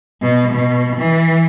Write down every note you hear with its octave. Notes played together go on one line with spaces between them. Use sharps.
B2
B2
E3